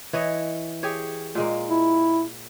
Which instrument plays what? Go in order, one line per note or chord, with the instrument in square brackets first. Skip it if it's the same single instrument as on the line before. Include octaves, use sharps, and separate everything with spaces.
[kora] E3 C#5 D#5
G4 G#4 C#5
A#2 G#3 A#3
[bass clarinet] E4